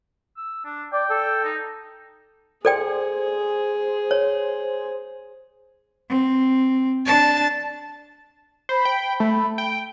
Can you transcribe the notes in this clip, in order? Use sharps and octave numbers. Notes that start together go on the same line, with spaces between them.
E6
D4
D5 G5
A4
D#4
G#4 A4 C5 D5 G5
C#5
C4
D4 A5
C5 B5
G5
A3
G5